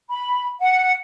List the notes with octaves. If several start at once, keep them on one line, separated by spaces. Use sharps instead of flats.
B5
F#5